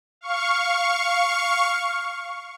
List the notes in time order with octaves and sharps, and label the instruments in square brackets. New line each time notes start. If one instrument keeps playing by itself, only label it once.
[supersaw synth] F5 C#6